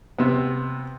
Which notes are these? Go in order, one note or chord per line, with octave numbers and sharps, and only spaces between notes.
C3 B3